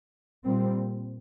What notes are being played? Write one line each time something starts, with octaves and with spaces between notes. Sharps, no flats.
A#2 G3 C4